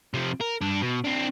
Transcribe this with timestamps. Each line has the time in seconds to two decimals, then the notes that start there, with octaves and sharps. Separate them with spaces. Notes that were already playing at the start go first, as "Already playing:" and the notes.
0.14 C3 F3
0.41 A#4
0.61 G2 D4
0.82 B2
1.05 C4 D4